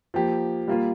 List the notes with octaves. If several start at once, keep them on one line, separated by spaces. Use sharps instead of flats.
F3 A#3 G4
G3 A#3 F4